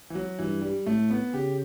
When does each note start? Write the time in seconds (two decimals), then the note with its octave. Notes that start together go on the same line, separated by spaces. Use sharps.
0.10 E3
0.15 F#3
0.39 G2 E3
0.62 G3
0.86 A2 A3
1.10 B3
1.33 C#3 G4